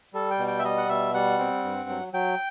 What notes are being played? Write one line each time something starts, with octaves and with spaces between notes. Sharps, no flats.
G3 A4
G5
B2
G5
E5
G3 D#5
F#5
B2 E5
G3 F#5
C4
G2
F#3
F#3 G5